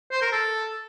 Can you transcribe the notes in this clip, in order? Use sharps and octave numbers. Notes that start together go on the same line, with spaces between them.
C5
A#4
A4